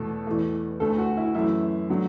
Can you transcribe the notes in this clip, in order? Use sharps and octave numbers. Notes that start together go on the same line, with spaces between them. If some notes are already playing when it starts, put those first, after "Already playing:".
Already playing: E2 B2 A3 A4
E2 E3 A3
D2 D3 A3 A4
F#4
E4
F#2 E3 A3 E4
D3 F#3 A3